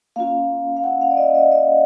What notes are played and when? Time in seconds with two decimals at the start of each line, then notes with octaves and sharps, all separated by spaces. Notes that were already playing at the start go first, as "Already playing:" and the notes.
0.16 A#3 C#4 F4 F5
0.77 F5
0.84 F#5
1.01 F5
1.11 D5
1.17 D#5
1.35 D#5
1.52 D#5